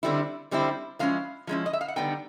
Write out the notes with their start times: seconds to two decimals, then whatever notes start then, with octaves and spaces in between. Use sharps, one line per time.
0.03 D3 G3 C4 E4
0.51 D3 G3 C4 E4
0.99 F3 G#3 C#4 E4 F5
1.47 F3 G#3 C#4 E4
1.66 D#5
1.73 E5
1.81 F5
1.88 F#5
1.96 D3 G3 B3 D#4 G5